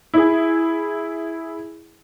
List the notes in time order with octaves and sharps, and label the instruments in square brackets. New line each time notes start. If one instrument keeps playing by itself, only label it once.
[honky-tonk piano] E4 G#4